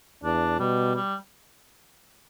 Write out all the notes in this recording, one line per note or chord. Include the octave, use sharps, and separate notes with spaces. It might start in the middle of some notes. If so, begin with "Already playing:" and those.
E2 D4
B2 G3
G3